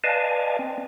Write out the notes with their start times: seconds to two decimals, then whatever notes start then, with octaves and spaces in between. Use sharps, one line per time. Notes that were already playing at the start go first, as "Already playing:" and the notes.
0.04 B4 D5 D#5 F5 G#5 A5
0.59 C4